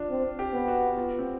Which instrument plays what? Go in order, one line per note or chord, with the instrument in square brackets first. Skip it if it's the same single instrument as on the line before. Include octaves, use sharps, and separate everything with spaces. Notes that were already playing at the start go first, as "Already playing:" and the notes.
Already playing: [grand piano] D4 F4
[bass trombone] C4
[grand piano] G4
[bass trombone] B3
[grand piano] F#4
F4
C4